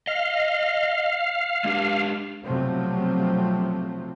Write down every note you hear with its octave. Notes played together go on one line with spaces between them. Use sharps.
D#5 F5
G#3 D4 G4
B1 C3 F3 F#3 A3 C4